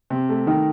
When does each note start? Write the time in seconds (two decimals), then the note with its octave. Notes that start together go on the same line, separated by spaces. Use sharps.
0.10 C3
0.29 A3
0.47 D#3